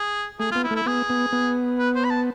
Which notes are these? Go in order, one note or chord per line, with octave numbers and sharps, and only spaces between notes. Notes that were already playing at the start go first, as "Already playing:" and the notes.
Already playing: G#4
A3 G#4
F4
B3
E4
A3
E4
B3 G#4
B3
B3
B4
C5
B5
A5